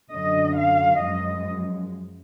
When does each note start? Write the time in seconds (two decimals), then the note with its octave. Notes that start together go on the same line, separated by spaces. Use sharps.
0.12 F#2 D3 F#3 D#5
0.57 F5
1.01 F#2 F3 G#3 D#5